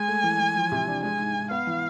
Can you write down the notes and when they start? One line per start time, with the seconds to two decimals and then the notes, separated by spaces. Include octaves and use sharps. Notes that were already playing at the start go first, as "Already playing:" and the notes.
Already playing: G#3 G#5
0.08 A3
0.24 E3
0.40 E3
0.56 F3
0.72 C3
0.87 D4
1.03 G#3 G#5
1.19 G#2
1.35 G#2
1.51 B3 F5
1.67 E3